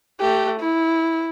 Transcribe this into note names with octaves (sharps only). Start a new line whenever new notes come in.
A3 G4
E4